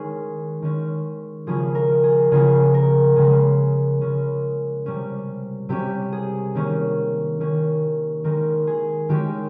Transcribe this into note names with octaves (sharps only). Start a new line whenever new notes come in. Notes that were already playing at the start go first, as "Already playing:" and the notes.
Already playing: D#3 G#3 C#4 G#4
D#3 G#3 C#4
C#3 F3 A#3 C#4 G#4
A#4
G#4
C#3 F3 A#3 C#4 G#4
A#4
C#3 G#3 C#4 G#4
C#3 G#3 C#4
C3 G3 C#4
C3 G3 C#4 G4
G#4
D#3 A#3 C#4
D#3 A#3 C#4
D#3 G#3 C#4 A#4
G#4
D#3 G#3 C#4 G4